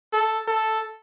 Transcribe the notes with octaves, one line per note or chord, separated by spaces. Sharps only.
A4
A4